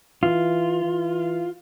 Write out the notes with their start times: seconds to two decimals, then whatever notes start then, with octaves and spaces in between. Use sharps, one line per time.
0.23 E3 F4
0.84 E3